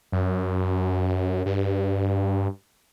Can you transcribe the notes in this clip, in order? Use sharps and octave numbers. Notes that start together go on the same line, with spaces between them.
F#2
G2